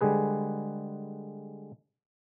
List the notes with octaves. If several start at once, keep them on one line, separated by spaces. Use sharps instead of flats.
D3 G3 G#3 G#4 B4